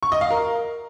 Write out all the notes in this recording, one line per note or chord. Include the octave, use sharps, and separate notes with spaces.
C#6
D#5
F5
A#4